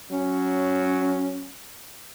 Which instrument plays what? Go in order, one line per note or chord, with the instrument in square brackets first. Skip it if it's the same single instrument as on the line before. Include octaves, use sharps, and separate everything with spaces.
[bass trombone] F#3 [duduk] C#4